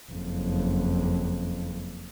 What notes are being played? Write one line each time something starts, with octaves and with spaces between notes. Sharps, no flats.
F#1 F2